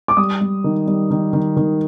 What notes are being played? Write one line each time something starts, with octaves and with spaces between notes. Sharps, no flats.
D6
G3 D#6
G3
D#3
G3
D#3
D#3
D#3